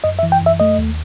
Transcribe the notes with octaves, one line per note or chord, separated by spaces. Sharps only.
F#2 D#5
E5
E3
G5
F#2 E5
A3 D#5
D#2